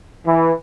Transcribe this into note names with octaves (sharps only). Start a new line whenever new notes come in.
E3